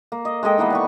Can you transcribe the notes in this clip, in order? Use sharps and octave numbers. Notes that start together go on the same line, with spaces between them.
A#3
D#5
G#3 A4 D#5 G5
D#3 E3 A#3 B3
D5 B5 C#6